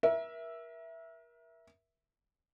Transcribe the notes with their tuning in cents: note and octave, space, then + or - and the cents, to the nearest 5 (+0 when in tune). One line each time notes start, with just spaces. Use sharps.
A#4 +35 E5 +0